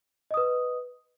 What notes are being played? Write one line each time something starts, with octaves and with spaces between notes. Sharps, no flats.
B4 D#5 D#6